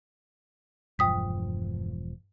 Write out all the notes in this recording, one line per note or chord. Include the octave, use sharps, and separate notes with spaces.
E1 G2 F3 G5 D#6 B6